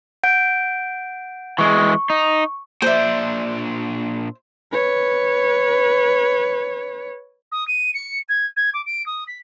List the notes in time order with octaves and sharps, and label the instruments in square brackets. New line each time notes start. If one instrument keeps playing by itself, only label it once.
[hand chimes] F#5 G6 D7
[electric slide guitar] E3 G#3 [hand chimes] C#6
[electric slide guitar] D#4
[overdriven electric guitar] A#2 D4 [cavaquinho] C5 E5
[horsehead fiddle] B4 C#5
[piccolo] D#6
D#7
C#7
G#6
G#6
D6
D7
D#6
B6